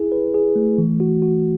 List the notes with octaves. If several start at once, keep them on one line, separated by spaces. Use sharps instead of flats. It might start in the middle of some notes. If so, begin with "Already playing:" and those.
Already playing: E4 G#4
B4
G#4
A3
E3
F#4
F#4